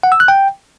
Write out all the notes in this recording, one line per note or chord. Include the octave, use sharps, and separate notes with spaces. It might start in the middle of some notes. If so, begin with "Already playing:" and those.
F#5
E6
F#6
G5